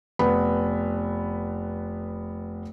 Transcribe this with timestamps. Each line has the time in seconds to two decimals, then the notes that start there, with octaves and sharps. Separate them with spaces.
0.19 F1 B3 B5